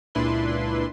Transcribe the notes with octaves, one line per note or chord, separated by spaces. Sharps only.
C#2 A#2 D4 E4 B4 C6